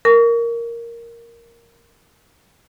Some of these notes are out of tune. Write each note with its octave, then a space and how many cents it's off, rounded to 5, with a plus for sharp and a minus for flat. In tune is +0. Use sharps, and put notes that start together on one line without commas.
A#4 +0 C#6 +35